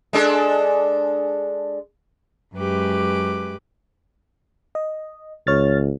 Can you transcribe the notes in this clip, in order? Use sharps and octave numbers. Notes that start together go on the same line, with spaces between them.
G#3 D4 A4
F#2 G#3 G4 B4 D6
D#5
C#2 C#5 F6 A6